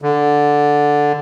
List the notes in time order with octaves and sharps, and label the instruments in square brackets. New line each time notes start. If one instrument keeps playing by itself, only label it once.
[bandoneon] D3